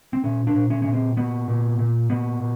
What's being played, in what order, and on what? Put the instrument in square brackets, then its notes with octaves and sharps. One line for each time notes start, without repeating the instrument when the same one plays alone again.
[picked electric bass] C4
A#2 C#4
D4
A#2
C#4
A#2 C#4
C4
A#2 B3
A#2
A#2
A#2 B3
A#2